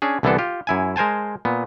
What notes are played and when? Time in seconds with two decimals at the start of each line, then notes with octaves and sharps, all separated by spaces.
0.02 C#4 D4 G#4
0.23 C2 D3 E3 B3 D4 A4
0.38 F4 G4
0.67 F#2 E4 G#5
0.96 G#3 A#4 C5 G#5 A5
1.45 A#2 B3